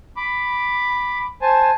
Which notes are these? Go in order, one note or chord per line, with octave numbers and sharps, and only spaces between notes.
B5 D6
C5 G#5 A5